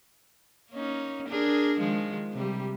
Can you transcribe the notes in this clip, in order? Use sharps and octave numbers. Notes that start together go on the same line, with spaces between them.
A#3 C#4 D#4
D4 G#4 A#4
D#3 F3 G#3
C3 G3